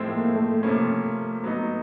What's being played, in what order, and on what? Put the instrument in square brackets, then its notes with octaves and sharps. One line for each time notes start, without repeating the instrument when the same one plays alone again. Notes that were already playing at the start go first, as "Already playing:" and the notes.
Already playing: [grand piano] A2 F3 G#3 C4 E4 [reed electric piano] A3
[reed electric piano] A#3
A3
[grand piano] C3 F3 A#3 C#4
F#3 B3 D#4